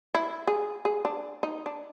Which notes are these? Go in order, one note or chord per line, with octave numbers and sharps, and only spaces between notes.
E4
G#4
G#4
D4
D#4
D4